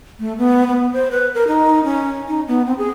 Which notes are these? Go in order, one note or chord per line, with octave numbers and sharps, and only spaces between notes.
A3
B3
B3
C5
B4
A#4
D#4
C#4
D#4
B3
C4
G#4